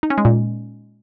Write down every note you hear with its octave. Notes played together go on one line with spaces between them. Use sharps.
D#4
C#4
G#3
A#2